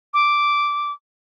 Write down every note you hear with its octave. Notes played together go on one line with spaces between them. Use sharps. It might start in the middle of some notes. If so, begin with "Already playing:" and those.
D6